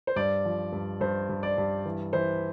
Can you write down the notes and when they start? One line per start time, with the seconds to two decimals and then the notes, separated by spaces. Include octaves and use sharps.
0.07 C5
0.16 G2 D5
0.45 F3
0.73 G2
1.01 G2 C5
1.30 G2
1.43 D5
1.58 G2
1.85 E3
2.13 E3 C5